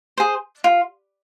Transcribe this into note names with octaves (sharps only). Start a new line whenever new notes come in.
G#4 C5
F4